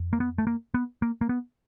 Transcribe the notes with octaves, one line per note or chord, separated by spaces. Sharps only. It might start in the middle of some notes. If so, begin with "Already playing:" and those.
Already playing: F2
A#3
B3
A3
A#3
B3
A#3
A#3
B3